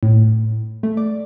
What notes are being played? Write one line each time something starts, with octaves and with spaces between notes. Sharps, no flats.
A2
A3
D5